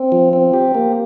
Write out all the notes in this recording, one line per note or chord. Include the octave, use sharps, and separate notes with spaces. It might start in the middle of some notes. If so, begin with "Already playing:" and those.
Already playing: C4
F3
C4
G4
A#3